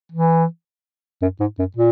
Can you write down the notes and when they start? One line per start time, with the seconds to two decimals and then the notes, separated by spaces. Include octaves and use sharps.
0.12 E3
1.22 F#2
1.40 G#2
1.59 F#2
1.76 A#2